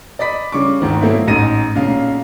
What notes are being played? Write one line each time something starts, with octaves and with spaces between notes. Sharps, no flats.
D5 D#5 B5 B6
C#3 G3 C#6 D6
G#1 G#2 D#3 C4
B2 F#3 A3 A#3 C4 E4
A1 G#2 D#4 A#6 D#7
B1 A#2 C#3 F5